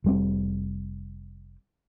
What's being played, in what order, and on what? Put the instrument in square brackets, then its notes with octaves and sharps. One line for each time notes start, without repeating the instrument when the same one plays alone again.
[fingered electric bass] F1 G3 C4